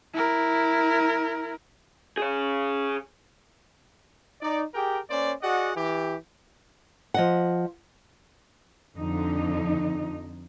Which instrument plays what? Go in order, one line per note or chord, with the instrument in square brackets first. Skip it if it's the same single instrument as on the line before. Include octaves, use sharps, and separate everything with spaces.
[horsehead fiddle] E4 A#4
[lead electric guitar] G#4 C#5
[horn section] D#4 D5
G4 G#4 A#4 G5
A#3 C#4 C5 D5
F#4 G#4 D5 D#5 F#5
E3 G4
[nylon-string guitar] F3 D#5 F#5
[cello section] F2 D3 D#4